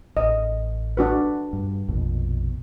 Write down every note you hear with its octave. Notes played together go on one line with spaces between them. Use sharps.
A1 D#5
D4 F#4 B4
G2
A#1 F2 B2